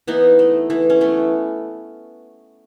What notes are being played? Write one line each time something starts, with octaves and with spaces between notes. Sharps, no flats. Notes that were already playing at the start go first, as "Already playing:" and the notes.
E3 B3 D#4
A3
E3
C#4
A3 B3